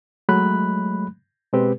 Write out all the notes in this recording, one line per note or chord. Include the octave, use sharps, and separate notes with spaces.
F#3 G#3 A3 B5 F#6
B2 G#3 C4 G4 B4